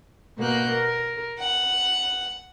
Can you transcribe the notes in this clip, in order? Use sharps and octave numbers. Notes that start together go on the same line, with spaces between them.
B2 A#3 F#6 G6
A#4
F#5